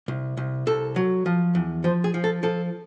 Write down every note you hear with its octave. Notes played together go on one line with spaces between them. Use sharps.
C2
C2
C2 A4
F#3
F3
E2
F3 C5
G#4
F3
A4
F3 A4